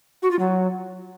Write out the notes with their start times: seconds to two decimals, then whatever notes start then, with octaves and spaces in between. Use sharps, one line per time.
0.22 F#4
0.31 F4
0.39 F#3